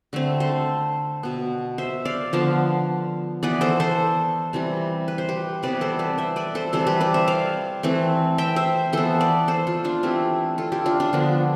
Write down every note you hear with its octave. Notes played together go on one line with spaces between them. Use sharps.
D3 A3 C4
A4 C5
B2 B3
C5 E5
D5 F5
D3 F3 B3 F5 A5
E3 B3 B4 D5
A4 C5
A4 C5
C3 E3 G3
B4
C5
G4 B4
C3 E3 G3 B3 B4 D5
A4 C5
B4 D5
C5 E5
B4 D5
A4 C5
C3 E3 G3 A4 C5
G4 B4
B4 D5
C5 E5
D5 F5
E3 A3 C4
E5 G5
C5 E5
E3 B3 A4 C5
B4 D5
A4 C5
F4 A4
D4 F4
E3 A3 C4 E4 G4
F4 A4
E4 G4
D4 F4
D4 F4
D3 F3 B3 D4